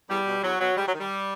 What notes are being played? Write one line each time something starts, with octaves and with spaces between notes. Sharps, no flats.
E2 G3
B2
E2 F#3
B2 F#3
G#2 G3
F#3
D#3
G3